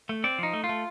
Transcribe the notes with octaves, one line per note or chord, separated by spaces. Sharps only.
A3
C4 D5
F3 D#4
A3
F4
A3